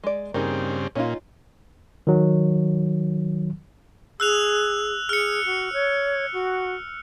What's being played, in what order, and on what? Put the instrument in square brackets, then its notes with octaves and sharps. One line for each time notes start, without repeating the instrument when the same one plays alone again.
[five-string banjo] G#3 D5
[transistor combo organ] G2 C#3 C4 [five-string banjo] A#3 D#4 G#4
[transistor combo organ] A#2 [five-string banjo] C#4 D#4 F4
[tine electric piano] D#3 F#3
[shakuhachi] G#4 [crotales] E6 F#6 F7
[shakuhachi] G#4 [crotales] F6 C#7
[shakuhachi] F#4
C#5
F#4